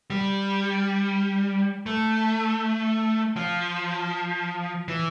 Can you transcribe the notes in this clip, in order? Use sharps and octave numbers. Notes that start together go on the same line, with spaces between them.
G3
A3
F3
E3